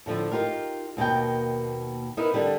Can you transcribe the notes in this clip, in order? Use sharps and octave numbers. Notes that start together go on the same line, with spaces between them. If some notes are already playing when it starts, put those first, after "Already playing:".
A2 D3 F3
D#4 F4 G4 A#4
D#2 B2 A#3 G5
B3 D#4 E4 A#4 B4
D3 G3